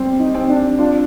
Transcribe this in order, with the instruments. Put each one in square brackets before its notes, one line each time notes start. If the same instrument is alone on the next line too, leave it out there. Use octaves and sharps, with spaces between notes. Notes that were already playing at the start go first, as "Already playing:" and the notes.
Already playing: [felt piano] G3 C4
[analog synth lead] D#4
[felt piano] C4
[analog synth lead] D4
[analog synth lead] D4 [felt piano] F4